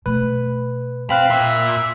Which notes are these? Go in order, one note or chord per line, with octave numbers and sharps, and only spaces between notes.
B2 A3 B4
C4 F5 B5 F#6
A#2 E5